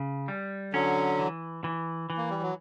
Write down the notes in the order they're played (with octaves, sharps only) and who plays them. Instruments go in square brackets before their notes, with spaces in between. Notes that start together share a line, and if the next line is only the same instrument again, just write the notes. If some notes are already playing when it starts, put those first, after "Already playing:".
Already playing: [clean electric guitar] C#3
G3
[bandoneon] D3 F#3 [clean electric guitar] C#4
[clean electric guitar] E3
E3
E3
[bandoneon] A#3
G3
F#3